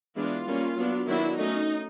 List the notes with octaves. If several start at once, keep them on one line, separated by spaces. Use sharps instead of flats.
E3 G#3 B3 D4 F4
G3 A#3 C#4
F#3 B3 D4
D#3 F#3 B3 D4 E4
F#3 A3 C#4 D#4